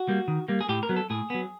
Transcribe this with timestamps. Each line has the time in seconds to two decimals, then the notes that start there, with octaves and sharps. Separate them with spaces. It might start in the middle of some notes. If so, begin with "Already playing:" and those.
Already playing: F#4
0.08 G3 A#3
0.28 D#3
0.48 G3 A#3
0.61 G#4
0.69 A2 G4
0.83 A#4
0.89 F#3 B3
0.96 A4
1.10 A2 G#4
1.30 F#3 B3